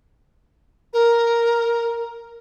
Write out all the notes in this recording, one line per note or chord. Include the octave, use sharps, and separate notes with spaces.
A#4